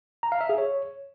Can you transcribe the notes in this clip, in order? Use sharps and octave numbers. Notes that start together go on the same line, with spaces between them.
A#5
F5
E5
G#4
C#5